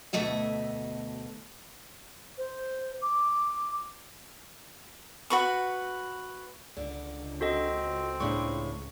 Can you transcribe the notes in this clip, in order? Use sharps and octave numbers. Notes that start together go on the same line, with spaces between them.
D2 B2 A3 D#5 E5
C5
D6
F#4 B4 C#6
C#2 D3
C4 F#4 A4 D#5
A2 C#3 D4 C#6